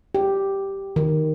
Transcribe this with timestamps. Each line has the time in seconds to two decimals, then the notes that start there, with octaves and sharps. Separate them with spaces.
0.15 G4
0.96 D#3